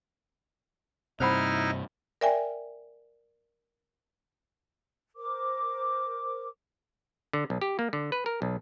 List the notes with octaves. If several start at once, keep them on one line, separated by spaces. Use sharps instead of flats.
G2 C3 D#4 E4 C5 F#5 B5 F6
A#4 D5 E5 G5 G#5
A#4 C5 D6
D3
B1
G4
A#3
D3
B4
A#4
B1